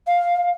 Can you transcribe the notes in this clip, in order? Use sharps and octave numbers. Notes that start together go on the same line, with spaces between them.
F5